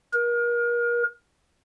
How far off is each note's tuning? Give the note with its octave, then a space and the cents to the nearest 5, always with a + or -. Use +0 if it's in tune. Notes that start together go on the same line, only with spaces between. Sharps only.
A#4 +35